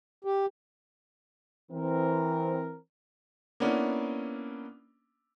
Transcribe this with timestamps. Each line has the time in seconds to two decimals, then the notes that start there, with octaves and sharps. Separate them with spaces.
0.25 G4
1.72 E3 C4 A#4
3.60 A#3 B3 C#4 D4 E4